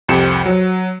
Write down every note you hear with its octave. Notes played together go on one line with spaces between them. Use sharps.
C2 F2 G4 C#7 E7
F#3